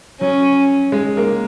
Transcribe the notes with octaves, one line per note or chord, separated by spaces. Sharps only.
F#3 C#4
G#3
A#3